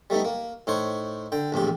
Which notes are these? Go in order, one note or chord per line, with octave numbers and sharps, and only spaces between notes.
G3 A3 B3 D#4
A#3
A2 D#4 C5 C#5
D3 G5
A#1 E2 A2 G4